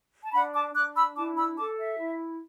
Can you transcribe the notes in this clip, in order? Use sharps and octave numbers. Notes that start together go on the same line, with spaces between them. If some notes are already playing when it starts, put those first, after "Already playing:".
A5
D4 F#5 B5
A5 D6
D4 D6 F#6
B5 E6
E4 A5 D6
B5 E6
A4 A5 D6
E5
E4